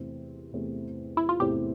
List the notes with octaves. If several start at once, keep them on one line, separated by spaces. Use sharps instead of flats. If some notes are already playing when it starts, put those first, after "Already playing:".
Already playing: E2 C3 E3 A3 C4
E2 C3 E3 A3 C4
E4
F4
E2 C3 E3 A3 C4 G4